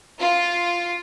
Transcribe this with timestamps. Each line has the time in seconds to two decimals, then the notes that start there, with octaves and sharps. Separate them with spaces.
0.20 F4